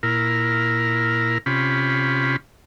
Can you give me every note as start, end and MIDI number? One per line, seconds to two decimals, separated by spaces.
0.03 1.38 46
0.03 1.38 64
0.03 1.38 70
0.03 1.38 89
1.46 2.36 48
1.46 2.36 61
1.46 2.36 65
1.46 2.36 67
1.46 2.36 83